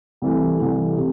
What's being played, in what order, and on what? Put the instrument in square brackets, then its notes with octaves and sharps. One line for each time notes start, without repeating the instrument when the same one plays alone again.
[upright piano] C2 C3 E3 A3
C2 C3 E3 A3
C3